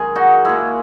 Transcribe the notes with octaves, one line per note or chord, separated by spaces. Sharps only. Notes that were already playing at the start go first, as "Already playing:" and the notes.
Already playing: F#2 D#3 G#3 G#4 A#4
D#4 F#4
A#2 G#3 E4 G#4